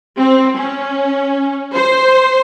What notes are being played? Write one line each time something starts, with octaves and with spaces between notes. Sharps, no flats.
C4
C#4
C5